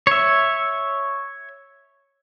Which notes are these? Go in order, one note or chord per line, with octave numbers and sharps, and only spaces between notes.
C#5 E5